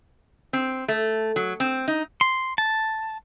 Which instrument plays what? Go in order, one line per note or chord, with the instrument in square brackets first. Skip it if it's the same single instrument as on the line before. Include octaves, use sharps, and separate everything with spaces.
[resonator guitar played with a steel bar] C4
A3
F#3
C4
D#4
[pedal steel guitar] C6
A5